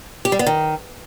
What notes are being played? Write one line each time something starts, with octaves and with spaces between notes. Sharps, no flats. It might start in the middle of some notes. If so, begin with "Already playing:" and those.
G4
G3
B3
D#3